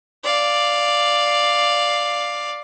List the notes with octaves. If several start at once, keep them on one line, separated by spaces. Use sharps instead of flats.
D5 F5